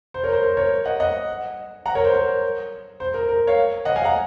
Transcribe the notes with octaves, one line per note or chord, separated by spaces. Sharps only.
C5
A#4 C#5
C5
A#4
A#4 C#5
D#5 F#5
D#5 F#5
F#5 A#5
A#4 C#5
C5
A#4
C5
A#4
A#4
C#5 F5
D#5 F#5
F5 G#5
F#5 A#5